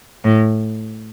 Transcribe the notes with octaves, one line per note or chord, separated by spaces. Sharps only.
A2